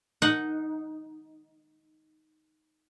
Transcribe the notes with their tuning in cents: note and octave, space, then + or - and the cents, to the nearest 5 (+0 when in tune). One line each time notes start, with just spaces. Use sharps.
D#4 +0 F#5 +0